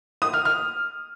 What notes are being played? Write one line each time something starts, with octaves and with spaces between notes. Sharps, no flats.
D#6
F6
F6